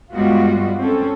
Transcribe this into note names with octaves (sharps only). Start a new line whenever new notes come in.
G2 G3 G#3 B3 F4 F#4
C4 C#4 A4